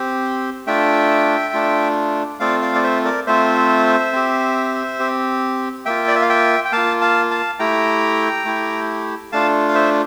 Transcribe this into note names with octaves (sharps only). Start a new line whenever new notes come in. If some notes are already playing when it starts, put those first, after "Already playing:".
Already playing: C4 G4
A3 D4 F4 E5 G5
A3 D4 F4
A3 C4 F4 D5 F5
D5 F5
D5
C5 E5
A#4 D5
A3 C4 F4 C5 E5
C4 G4
C4 G4
A#3 F4 E5 G5
D5
E5
F5
E5 G5
G5
A#3 F4 F5 A5
F5 A5
F5 A5
A3 E4 G4 G5 A#5
A3 E4 G4
A3 D4 F4 F5 A5
F5
C5 E5